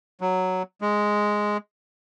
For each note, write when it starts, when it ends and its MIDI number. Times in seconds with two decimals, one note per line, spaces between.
0.21 0.63 54
0.82 1.57 56